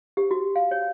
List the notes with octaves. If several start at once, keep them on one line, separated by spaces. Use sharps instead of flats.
G4
F#4
F5
C#5